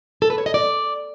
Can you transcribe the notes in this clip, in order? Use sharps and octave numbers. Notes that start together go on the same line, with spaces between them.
A4
B4
C#5
D#5
D5